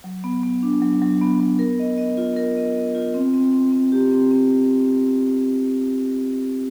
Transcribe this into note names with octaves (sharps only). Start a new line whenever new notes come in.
F#3
B3
B3
D4
F#3
F#3
B3
B3
A#4
D#5
D#5
F4
A#4
D#5
D#5
F4
C4
C4
C4
C4
G4
C4
C4